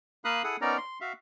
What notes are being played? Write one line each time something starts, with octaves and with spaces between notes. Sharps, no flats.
A#3 A#4 F5 B5 D#6 F#6
E4 G#4 A4 F#5 D#6
B3 C#4 D#4 A#4 D5 A#5
C6
F#4 E5 F5